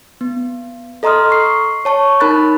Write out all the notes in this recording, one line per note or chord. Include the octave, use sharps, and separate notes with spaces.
B3
A4 D#5 A#5 C6 D#6 F6
C#6 C7
C#5 A5 C#6
D#4 A#4 B5 F#6 A6